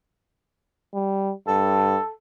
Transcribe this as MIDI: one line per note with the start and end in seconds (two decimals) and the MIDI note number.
0.94 1.33 55
1.47 1.98 43
1.47 2.10 69